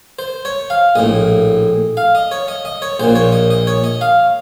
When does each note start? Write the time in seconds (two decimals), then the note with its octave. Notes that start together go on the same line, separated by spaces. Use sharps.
0.19 C5
0.45 C#5
0.70 F5
0.95 A#1 A2 D#5
1.97 F5
2.15 D#5
2.31 C#5
2.48 D#5
2.65 D#5
2.82 C#5
3.00 A#1 A#2 C5
3.15 C#5
3.32 D#5
3.51 D#5
3.67 C#5
3.84 D#5
4.01 F5